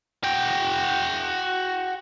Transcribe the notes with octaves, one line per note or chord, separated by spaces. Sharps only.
F#4 G5